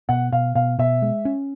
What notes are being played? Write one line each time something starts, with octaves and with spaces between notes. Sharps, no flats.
B2 F#5
B2 F5
B2 F5
B2 E5
G#3
C#4